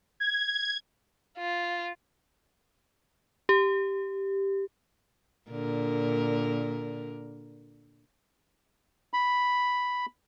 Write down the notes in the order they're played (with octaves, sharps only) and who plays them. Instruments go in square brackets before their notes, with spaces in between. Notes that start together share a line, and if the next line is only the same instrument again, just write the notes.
[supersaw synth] G#6
[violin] F4
[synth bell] G4
[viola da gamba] A#2 D3 A#4
[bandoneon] B5